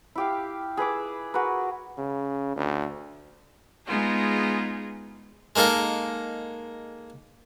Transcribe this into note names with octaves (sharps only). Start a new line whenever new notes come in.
E4 G4 F5
G#4 B4 E5 D6
F#4 G#4 A#4 B4
C#3
D2
G#3 B3 D#4 F4 G#4
G#3 A#3 D#4 A4 A#4